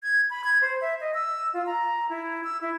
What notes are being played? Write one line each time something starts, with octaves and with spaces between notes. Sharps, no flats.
G#6
B5
G#6
C5
E5
D#5
E6
F4
A#5
E4
E6
E4